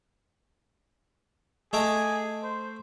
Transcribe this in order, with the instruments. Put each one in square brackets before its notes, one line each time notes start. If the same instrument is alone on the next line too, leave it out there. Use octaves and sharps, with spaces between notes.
[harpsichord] A3 A#5 D6 [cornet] G#4 [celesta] D#5 A5
[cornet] C5